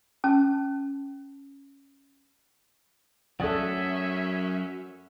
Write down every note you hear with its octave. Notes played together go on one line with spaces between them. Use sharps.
C#4 A5
F#2 F#3 C#4 A4 D5 E5 F#5 D#6